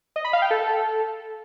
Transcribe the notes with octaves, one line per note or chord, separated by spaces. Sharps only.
D#5
B5
F5
G5
A4